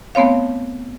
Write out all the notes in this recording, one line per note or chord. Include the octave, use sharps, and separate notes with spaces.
A3 B3 C4 C#5 F5